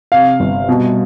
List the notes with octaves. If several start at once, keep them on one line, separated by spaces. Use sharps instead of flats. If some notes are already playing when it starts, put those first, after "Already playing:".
C3 F5
G1
B2